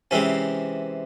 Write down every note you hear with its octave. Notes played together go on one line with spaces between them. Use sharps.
C3 E3 G#3 C4 C#4